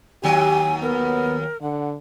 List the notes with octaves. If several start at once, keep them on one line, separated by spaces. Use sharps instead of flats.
D#2 F#3 G4 G#5
B3 A#4
D3 F#5